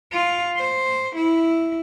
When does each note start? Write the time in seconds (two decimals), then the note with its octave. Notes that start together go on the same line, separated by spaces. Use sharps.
0.12 F4
0.56 C5
1.16 E4